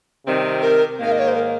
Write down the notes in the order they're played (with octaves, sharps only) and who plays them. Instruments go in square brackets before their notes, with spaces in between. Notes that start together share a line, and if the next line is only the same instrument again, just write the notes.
[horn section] C3 D#3 G3 C4
[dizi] A#4
[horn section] G#2 D#3 A#3 [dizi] F5
[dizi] D#5
C#5
C5
A#4